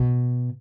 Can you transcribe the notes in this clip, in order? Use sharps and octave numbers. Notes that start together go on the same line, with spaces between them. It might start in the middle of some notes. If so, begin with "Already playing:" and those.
Already playing: B2